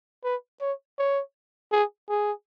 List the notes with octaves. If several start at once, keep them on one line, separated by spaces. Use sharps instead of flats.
B4
C#5
C#5
G#4
G#4